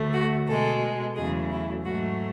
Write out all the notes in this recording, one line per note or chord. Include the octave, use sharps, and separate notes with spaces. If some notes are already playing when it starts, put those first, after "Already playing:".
Already playing: D2 D3 A3
F#4
B2 G#3 A4
E2 C#3 F#3 A3 G#4
E4
G#2 F#3 A3 F#4